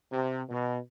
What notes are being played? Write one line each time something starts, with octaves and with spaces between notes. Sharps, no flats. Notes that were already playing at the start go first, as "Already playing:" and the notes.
C3
B2